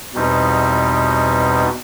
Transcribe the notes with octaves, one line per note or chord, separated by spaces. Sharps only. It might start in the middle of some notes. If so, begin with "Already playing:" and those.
E2 B2 G3 C4 D#4